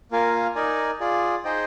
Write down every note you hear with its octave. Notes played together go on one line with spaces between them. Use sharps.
A#3 F4 A#4 F5 G#5
D#4 A#4 D5 G#5
F4 G#4 D5
D#4 G#4 C5 D#5 G5